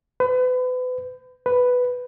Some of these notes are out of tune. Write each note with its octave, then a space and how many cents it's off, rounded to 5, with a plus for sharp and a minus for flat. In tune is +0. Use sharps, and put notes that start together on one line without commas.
B4 +35
B4 +5